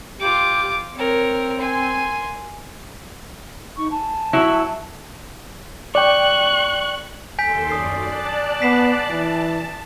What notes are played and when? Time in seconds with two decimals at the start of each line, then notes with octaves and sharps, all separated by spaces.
0.20 F4 G4 D6
0.94 C4 A#4 C#5
1.59 G#5 C6
3.77 D#4 C#6
3.90 G#5 A5
4.33 F#3 E4 E5
5.95 D5 G5 C#6 F#6
7.39 D#2 A4 G#5 C6 G6 B6
7.69 F#2 C#4 D5 D#6 C7
7.98 D5 A5 F#6
8.62 B3 B6 C7 E7
9.10 E3 A5